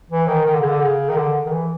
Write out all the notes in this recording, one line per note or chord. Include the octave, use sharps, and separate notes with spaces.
E3
D#3
D#3
D3
C#3
D3
C#3
D#3
D3
D#3
E3